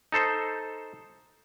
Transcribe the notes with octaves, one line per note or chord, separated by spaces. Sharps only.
D#4 A4 C5